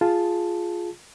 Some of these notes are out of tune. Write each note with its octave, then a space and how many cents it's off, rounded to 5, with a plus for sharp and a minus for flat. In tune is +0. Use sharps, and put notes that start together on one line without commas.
F4 +0 G#4 +0 A5 +0